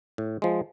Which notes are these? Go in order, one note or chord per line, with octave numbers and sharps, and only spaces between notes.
A2
F3 G#3